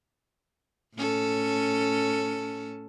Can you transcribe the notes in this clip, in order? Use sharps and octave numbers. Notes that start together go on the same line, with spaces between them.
A2 C#4 A4